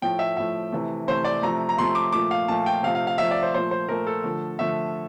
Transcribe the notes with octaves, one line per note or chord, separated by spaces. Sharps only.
A2 F3 A3 G5
E5
A2 F3 A3 E5
C3 E3 A3
C3 E3 A3 C5
D5
C3 F3 A3 A#5
A#5
C3 F3 A3 C6
D6
A#2 F3 A3 D6
F5
A#2 F3 A3 A5
G5
C3 F3 A3 F5
F5
F5
C3 F3 A3 E5
D5
C5
A#2 F3 A3 C5
C5
A#2 F3 A3 A#4
A4
D3 F3 A3
D3 F3 A3 E5